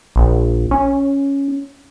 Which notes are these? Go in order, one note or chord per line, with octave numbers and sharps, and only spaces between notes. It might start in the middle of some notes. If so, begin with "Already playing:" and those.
A#1
C#4